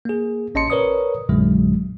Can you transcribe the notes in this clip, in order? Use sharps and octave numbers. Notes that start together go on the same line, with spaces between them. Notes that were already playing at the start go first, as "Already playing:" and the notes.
A#3 G#4
A1 C#4 D#5 A5 C6 C#7
A#4 B4 C#5 D5 D#6
A#1 F#2 A#2 D3 F#3 G#3